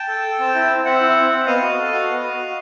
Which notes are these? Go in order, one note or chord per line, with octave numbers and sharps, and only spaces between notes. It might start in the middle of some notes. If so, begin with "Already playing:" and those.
Already playing: G5 A5
A4
A4
C4
E4
C4
C4 E5 F#5
E4
C4
C4
B3 D#5 F5
F#4
A4
F#4
B3
F#4
F#4